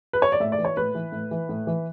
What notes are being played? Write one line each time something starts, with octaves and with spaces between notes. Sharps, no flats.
B4
C#5
D5
A2 E5
D5
E3
C#5
A2 B4
E3
A2
E3
A2
E3